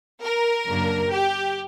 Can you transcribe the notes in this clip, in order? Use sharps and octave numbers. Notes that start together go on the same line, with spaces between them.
A#4
F#2 C#3 F#3 A#3 D4
G4